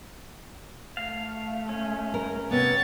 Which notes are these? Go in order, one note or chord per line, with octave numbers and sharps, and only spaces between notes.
A3 F5
C#4
A#4
C3 B3 C#5 A6